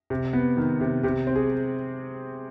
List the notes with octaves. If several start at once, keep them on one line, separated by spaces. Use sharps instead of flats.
C3
B3
D#3
C3
C3 G4
C4
G#4